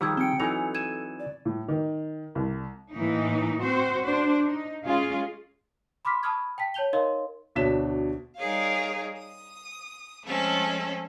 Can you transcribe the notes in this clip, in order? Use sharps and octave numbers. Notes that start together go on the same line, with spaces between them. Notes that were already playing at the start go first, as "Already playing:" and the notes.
D#3 F3 G3 G4 G#4 E6 G#6
C4 G5 C#7
E3 F#3 D#4 A4 G#5 F7
G#6 D#7 E7
D5
A2
D#3
C2
A2 E3 A#3 D#4
C4 F#4 C5
D4 C5
D#4
G#3 C#4 F4 G#4
B5 C6 D6 F6 B6
A5 B5 C#6 D#6 F6 G#6
G5 A5 B6
C#5 A5 G6 F7 G7
D#4 A#4 C#5 D#5 F5 C6
D2 B2 D4 C#5 B6 E7
G3 D#4 G#4 A#4 C#5 F5
D#6
F3 G#3 A3 C4 C#4 A4